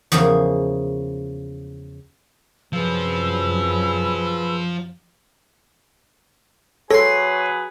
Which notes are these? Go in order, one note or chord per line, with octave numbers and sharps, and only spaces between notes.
E2 C#3 F3 A#3 G#4
F#2 C3 F3 F#3 G#4 B4 E6
F#3 G#4 A4 B4 C#5 C6